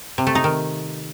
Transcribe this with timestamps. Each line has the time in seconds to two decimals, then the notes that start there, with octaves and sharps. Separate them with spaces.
0.18 C3
0.27 A3
0.35 D#4
0.44 D#3